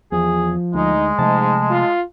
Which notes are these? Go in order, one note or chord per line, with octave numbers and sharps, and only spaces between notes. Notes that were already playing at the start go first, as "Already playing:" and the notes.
E2 F3 G#4
D2 G#3 D#4
G#2 C3 F3 A3 A5
F4